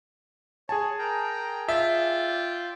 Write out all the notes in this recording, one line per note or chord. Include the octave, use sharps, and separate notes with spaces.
G#4 C#5 G#5 A5
A#4 G5 A#5
F4 D5 E5 G5